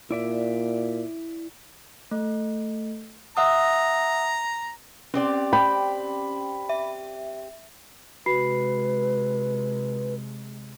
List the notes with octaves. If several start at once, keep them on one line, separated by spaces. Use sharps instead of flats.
A#2 E4 D5 E5
A3
E5 F#5 A#5 D#6
C4 C#4 G4 D5
G5 B5
E5
C3 G#3 F#4 B4 B5 C7